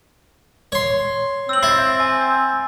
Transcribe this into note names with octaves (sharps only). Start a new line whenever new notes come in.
C#5 C6
C4 E6 F#7
E4 G6 A6 C7
G#5